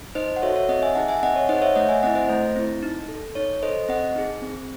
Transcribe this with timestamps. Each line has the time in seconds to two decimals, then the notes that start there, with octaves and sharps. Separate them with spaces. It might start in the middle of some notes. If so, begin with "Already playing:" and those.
0.15 D#4 C5 D#5
0.36 F#5
0.42 F#4 A4 C#5 E5
0.56 C#5 E5
0.69 C4 D#5 F#5
0.83 E5 G#5
0.95 D#4 G#4 F#5 A5
1.08 E5 G#5
1.22 C4 D#5 F#5
1.36 C#5
1.49 D#4 G#4 C5 D#5
1.58 F#5
1.62 C#5 E5
1.75 A3 D#5 F#5
1.89 E5 G#5
2.03 C4 E4 D#5 F#5
2.15 C5 D#5
2.29 A3 C5
2.56 C4 E4
2.82 D#4
3.09 A4
3.35 D#4 C#5
3.63 A4 C5 D#5
3.89 C4 D#5 F#5
4.15 D#4 G#4
4.42 C4